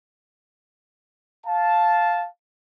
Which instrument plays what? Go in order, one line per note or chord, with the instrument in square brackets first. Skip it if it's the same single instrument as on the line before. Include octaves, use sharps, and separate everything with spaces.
[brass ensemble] F5 A5